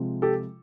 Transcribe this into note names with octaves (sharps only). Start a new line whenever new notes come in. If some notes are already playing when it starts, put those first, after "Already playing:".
Already playing: C3 F3 G#3
G4 A4